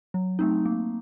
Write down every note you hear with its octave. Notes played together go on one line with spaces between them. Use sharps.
F#3
A3 C4 D#4
A#3